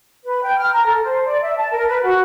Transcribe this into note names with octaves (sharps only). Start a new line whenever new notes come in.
B4
G5
F6
A#5
A4
C5
D5
E5
A5
A#4
B4
F#4